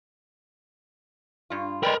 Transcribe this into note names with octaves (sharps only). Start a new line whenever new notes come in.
G2 F4
G#3 A#4 B4 D5 G5